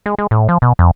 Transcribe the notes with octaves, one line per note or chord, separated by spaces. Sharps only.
G#3
G#3
A2
F3
B2
F2